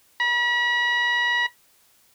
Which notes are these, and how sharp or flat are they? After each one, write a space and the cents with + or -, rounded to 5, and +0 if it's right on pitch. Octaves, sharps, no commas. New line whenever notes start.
B5 -40